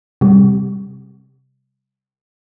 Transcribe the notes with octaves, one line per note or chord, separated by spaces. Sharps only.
C3 G3